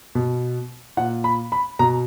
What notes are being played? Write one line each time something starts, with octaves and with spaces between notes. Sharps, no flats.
B2
A#2 F#5
B5
B5
B2 A#5